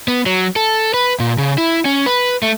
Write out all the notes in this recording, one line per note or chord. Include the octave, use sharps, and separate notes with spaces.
B3
F#3
A4
B4
A#2
C#3
E4
C#4
B4
A3